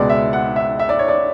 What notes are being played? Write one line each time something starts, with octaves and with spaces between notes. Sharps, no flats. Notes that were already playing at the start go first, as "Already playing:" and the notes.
Already playing: C#2 B2 G#3 D5
E5
F#5
E5
E5
D5
C#5
D5